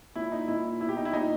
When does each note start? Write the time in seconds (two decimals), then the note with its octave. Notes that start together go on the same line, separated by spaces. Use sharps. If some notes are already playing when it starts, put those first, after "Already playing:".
0.15 A#2 E4
0.32 D#4
0.48 A#2 E4
0.80 B2 E4
0.89 G4
0.97 D#4
1.05 E4
1.13 A#2 D#4